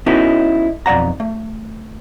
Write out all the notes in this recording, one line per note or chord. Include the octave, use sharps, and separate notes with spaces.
B3 C#4 D#4 E4 F#4 A4
B1 F2 D5 F#5 A#5
A3